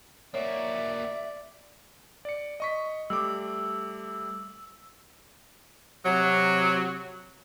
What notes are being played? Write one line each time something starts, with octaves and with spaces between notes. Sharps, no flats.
A#3 F#4 C#5 D5 E5
D5 C#7
D#5 C#6 B6
G3 A3 D6 E6
C3 F#3